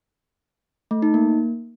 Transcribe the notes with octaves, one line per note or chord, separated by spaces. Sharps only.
A3
D#4
A#3